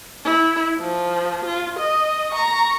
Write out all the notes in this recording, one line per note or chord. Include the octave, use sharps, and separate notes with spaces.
E4
F3
F4
D#5
A#5 C#6